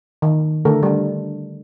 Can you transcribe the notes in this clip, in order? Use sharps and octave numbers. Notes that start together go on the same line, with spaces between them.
D#3
D3 A3 A4 A#4
G3 D4